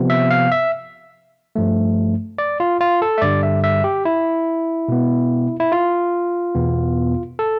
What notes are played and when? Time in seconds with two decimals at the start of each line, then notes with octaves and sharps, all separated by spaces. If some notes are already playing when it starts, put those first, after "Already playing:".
Already playing: C3 F3 B3
0.10 E5
0.31 F5
0.52 E5
1.56 G2 F3 A3
2.38 D5
2.60 F4
2.81 F4
3.02 A4
3.18 E5
3.22 G2 D3 G3 D5
3.43 E5
3.64 E5
3.84 G4
4.05 E4
4.88 B2 B3
5.60 E4
5.72 F4
6.55 E2 B2 B3
7.39 A4